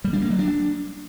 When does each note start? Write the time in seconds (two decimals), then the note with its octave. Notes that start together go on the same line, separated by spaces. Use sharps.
0.04 G3
0.13 D4
0.22 A#3
0.30 F#3
0.39 D4